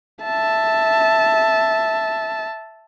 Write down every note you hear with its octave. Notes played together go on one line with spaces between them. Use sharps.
E5 A5